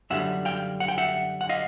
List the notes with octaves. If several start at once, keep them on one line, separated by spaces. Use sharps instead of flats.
F#2 D3 G3 E5 F#5
F5 G5
F#5
G5
E5 F#5
F#5
D#5 F5